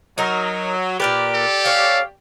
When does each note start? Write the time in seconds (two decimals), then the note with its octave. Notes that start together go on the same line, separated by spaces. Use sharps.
0.18 F#3 D#4 A#4
1.00 A#2 G4 A#4 B4 D5
1.34 A4
1.65 C#4 C#5 F5